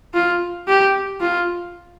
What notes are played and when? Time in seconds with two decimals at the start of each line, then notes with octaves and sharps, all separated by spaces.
0.14 F4
0.68 G4
1.20 F4